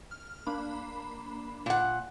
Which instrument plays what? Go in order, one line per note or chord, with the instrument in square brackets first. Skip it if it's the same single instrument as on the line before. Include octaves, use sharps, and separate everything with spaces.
[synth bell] F6
A#3 D4 B5
[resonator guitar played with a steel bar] A#2 F#5